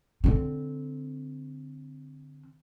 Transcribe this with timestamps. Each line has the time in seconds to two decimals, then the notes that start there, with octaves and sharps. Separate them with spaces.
0.24 D3 C4